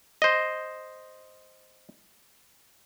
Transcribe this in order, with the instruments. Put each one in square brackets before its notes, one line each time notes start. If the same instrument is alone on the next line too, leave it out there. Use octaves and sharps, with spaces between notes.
[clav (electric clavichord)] C5 D#5